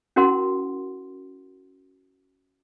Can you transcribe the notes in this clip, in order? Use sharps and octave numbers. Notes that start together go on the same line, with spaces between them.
C#4 E4 F#4 A#4 F#5 C6